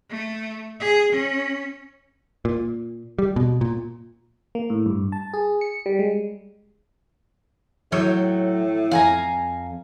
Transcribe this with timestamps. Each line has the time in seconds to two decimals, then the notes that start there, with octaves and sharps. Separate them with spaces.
0.10 A3
0.80 G#4
1.12 C#4
2.45 A#2
3.19 G3
3.36 B2
3.61 A#2
4.55 A#3
4.70 A2
4.86 G2
5.12 A5
5.34 G#4
5.61 C#7
5.86 G3
5.99 G#3
7.92 A2 F#3 C#5 G5 E6
8.91 F2 F5 G#5 A#5